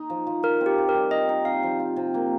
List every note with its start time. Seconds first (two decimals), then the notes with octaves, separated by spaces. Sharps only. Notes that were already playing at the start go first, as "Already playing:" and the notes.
Already playing: D#4
0.10 F3
0.27 F3
0.43 F4 A#4
0.61 C4
0.66 G4
0.78 F4
0.89 A#4
0.94 G3
1.11 D#4 D#5
1.29 D#4
1.45 C3 F5
1.63 F3
1.79 F4
1.96 C3
2.14 A#3